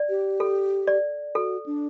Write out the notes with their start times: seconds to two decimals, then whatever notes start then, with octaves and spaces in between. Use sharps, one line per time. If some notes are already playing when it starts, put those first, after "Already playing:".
Already playing: D5
0.09 G4
0.40 A4
0.87 D5
1.35 F#4 A4
1.66 D4